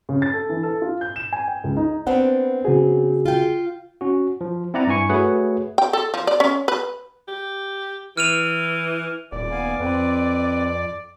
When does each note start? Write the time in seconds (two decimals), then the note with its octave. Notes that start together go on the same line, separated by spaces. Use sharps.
0.09 C#3
0.22 A6
0.33 A4
0.49 E3
0.63 A4
0.82 F4
1.01 G6
1.16 E7
1.33 G#5
1.48 G5
1.64 C#2
1.77 D#4
2.07 B3 C4 D4 B4 F#5
2.65 C#3 F#4 G#4
3.26 F4 G5
4.01 C#4 F#4
4.41 F3
4.74 C4 E4 D5 F#5 A#5
4.87 G2 E4 G#5 C#6 C#7
5.09 A3 F#4 G#4 B4 C#5 F#5
5.78 G5
5.93 A4
6.14 F3
6.27 D5
6.40 C#4
6.68 B4
7.28 G4
8.17 E3 F6 D#7 F7
9.32 D#1 D5
9.51 B3 F5 G#5
9.80 F2 C4 B4